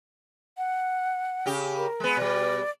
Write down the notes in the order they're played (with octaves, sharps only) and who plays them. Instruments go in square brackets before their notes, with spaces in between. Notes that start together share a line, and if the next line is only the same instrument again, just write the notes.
[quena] F#5
[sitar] C#3 G4
[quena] A#4
[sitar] G#3 B3
[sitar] B2 G3 [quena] D5